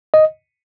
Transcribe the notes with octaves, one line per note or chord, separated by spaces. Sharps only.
D#5